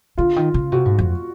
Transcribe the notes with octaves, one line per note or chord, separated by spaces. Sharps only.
D3 F4
D#3
C#3
C3 F#4
G#2
F2